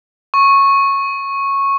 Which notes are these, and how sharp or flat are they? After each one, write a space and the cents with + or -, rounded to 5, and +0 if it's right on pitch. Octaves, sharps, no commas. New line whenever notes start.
C#6 -10